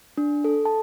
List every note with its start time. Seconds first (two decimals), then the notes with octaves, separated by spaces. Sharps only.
0.18 D4
0.44 A4
0.65 A5